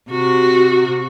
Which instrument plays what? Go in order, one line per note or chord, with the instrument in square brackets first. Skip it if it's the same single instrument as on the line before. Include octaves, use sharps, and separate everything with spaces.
[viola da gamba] C3 [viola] F#4